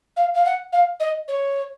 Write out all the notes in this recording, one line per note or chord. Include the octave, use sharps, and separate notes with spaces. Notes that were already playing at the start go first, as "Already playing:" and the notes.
F5
F5
F#5
F5
D#5
C#5